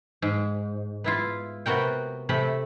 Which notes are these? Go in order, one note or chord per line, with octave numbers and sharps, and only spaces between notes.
G#2
B3 E4 F4
C3 B3 F#4 A#4 G5
C3 A3 B5